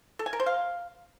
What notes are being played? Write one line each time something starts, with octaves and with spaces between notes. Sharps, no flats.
A4
G#5
A#4
C5
F5